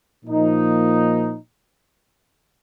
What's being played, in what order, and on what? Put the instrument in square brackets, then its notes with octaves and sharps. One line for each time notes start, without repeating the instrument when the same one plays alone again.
[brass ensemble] A#2 F3 A#3 D#4